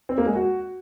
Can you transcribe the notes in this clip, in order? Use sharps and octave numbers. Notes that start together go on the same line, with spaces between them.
C4
A#3
G#3
F#4